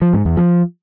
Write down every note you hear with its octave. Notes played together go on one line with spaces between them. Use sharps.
F3
G#2
E2
F3